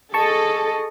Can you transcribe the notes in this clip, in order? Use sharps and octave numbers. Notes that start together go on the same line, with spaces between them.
G#4 A4 D#5 A5 C#6